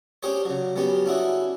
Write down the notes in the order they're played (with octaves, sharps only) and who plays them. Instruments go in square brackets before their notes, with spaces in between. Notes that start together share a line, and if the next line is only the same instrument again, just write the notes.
[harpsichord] C#4 D4 G4 G#4 C5 C#5
C#3 F#3
F#3 G3 B3 C#4 G4
C#4 D4 E4 F#4 G#4